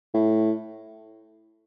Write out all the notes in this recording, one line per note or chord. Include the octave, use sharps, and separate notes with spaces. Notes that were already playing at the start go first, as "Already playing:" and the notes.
A2